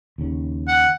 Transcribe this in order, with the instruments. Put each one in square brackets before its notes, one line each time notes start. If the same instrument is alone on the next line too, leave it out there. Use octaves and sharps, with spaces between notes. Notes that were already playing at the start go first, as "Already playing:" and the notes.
[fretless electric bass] D#2 C#3
[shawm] F#5